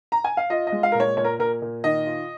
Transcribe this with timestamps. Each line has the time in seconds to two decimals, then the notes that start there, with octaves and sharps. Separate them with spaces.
0.12 A#5
0.24 G#5
0.37 F5
0.50 F4 D#5
0.67 D#5
0.72 G#3
0.83 F5
0.92 A#2 A#4
1.00 C#5
1.17 A#2 C#5
1.24 A#4
1.39 A#2 A#4
1.62 A#2
1.84 D#3 D#5
2.06 F4